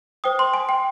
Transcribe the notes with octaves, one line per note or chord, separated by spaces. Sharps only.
C5 G5 D#6
C6
G#5
G5